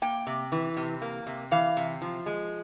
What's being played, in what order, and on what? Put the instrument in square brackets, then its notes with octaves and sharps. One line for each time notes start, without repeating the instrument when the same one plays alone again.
[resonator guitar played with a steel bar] A#3 G5
C3
E3
C3
A#3
C3
E3 F5
C3
F3
G#3